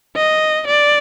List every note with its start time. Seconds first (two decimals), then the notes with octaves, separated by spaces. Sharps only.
0.16 D#5
0.67 D5